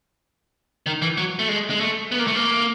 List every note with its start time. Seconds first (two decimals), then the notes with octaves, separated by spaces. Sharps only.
0.86 D#3
1.02 E3
1.18 F#3
1.39 A3
1.49 G#3
1.70 G#3
1.80 A3
2.12 B3
2.19 A#3
2.27 A3
2.35 A#3